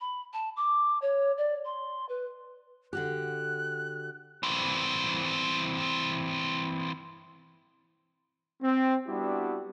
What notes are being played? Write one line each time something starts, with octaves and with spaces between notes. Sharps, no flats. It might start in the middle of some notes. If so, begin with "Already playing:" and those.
B5
A5
D6
C#5
D5
C6
B4
D3 F#4 G4 F#6
E3 C4
C4
G3 B3 D4 E4 F#4 G4